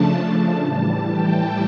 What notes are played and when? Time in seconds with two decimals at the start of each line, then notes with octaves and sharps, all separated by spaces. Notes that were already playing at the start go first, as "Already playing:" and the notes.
Already playing: C#3 F3 A3 D4 A5
0.59 A2 E3 G3
1.10 G5